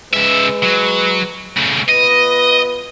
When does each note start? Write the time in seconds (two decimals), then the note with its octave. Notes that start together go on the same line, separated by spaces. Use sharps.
0.13 C#3 G#3 B4 E5
0.63 F#3
1.57 C#3 A3
1.88 B3 F4 B4 D#5